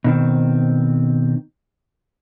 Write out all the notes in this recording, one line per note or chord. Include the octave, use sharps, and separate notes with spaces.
B2 D#3 C4